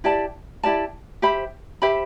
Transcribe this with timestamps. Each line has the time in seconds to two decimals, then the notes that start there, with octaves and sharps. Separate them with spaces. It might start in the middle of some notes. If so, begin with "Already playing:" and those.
0.04 E4 G4 D5 A5
0.63 E4 G4 D5 A5
1.22 G4 C5 E5 B5
1.82 G4 C5 E5 B5